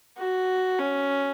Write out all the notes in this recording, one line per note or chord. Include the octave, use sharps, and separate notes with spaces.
F#4
C#4